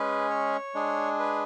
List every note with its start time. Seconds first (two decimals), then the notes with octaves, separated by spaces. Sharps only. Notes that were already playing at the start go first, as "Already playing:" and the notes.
Already playing: G#3 C#4 G#4 B4
0.30 C#5
0.74 G#3 D4 G#4
1.19 B4